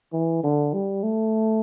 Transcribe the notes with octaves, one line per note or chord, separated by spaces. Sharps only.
E3
D3
G3
A3